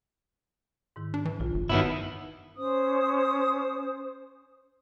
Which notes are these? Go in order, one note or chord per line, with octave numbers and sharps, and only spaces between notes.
G#2 D#3 E4
D4
E3
B1 F4
G1
G2 D#3 B3 E4 F#4 C#5 A5
C#4 C5 D#6